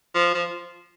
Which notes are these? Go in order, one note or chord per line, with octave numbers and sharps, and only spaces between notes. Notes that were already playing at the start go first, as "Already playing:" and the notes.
F3
F3